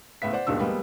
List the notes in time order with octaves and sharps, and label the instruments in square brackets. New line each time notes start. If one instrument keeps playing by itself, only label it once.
[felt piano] C#2 A2 B3 E5 B6
C5 D5 F#5
D#1 C#2 G#2 B2 D4 E6
F3 G3 G#3 A#3 B3